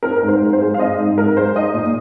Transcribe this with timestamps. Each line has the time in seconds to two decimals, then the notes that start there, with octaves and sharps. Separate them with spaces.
0.03 C4 A#4
0.16 A#4
0.21 G#2
0.28 C5
0.41 G#2
0.53 C5
0.60 G#3
0.74 F5
0.78 C4 D#5
0.97 G#2
1.18 G#2 A#4
1.36 G#3 C5
1.55 D#4 D#5
1.74 A#2